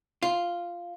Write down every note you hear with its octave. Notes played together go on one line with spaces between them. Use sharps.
F4